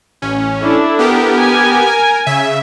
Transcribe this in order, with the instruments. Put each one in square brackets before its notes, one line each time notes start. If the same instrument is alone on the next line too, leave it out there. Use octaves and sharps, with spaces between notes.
[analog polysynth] A1 C#4
[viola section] D4 E4 A4
[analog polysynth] B3 G4 A#4
[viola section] G#5
[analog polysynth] A#4
C#3 E5